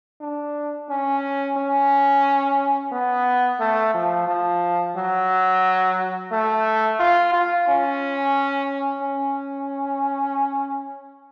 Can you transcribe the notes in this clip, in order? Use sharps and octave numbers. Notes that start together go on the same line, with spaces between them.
D4
C#4
C#4
B3
A3
F3
F3
F#3
A3
F4
F4
C#4
C#4